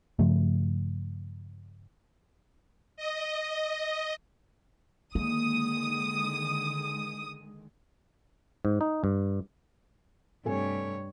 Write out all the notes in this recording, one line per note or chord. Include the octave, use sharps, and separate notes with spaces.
G2 C#3 F3 A3
D#5
D3 D#3 G#3 A#3 D#6
G#2
D#4
G2
G2 C3 A3 C#5 G#5